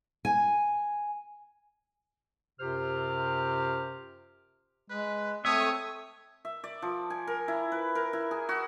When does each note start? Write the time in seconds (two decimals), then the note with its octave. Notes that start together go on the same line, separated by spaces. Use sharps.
0.25 G#5
2.60 F#2 C3 F4 G4 C5 F6
4.90 G#3 B4
5.45 A3 C4 C#5 E5 D#6
6.45 E5
6.64 D5
6.82 F3
7.10 G#5
7.28 A#4
7.48 E4
7.72 B4
7.95 A#4
8.13 E4
8.31 G#4
8.49 F#4